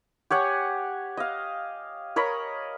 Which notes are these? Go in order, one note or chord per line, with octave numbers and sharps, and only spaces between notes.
G4 C#5 F#5 G#5
D#5 F5
A#4 C#5 D#5 B5